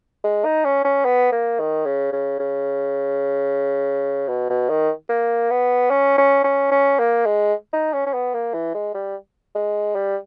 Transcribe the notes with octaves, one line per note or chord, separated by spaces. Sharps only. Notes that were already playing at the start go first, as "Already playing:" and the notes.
G#3
D#4
C#4
C#4
B3
A#3
D#3
C#3
C#3
C#3
B2
B2
D#3
A#3
B3
C#4
C#4
C#4
C#4
A#3
G#3
D#4
C#4
C#4
B3
A#3
E3
G#3
G3
G#3
G3